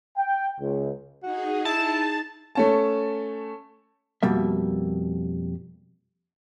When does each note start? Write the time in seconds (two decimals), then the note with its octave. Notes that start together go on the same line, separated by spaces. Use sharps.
0.17 G5
0.60 C#2
1.23 D#4 F#4 G#4
1.65 E4 A5
2.55 A3 C#4 A5
4.23 F2 B2 G3 A#3 E5